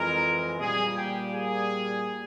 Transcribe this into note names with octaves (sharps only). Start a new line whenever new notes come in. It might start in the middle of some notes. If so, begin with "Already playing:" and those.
Already playing: F2 E3 G#3 A#4
A#2 G3 A#3 G#4
G4
G#4